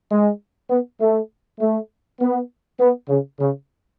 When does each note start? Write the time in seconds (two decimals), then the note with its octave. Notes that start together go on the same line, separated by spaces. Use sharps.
0.11 G#3
0.70 B3
1.01 A3
1.60 A3
2.20 B3
2.80 B3
3.09 C#3
3.40 C#3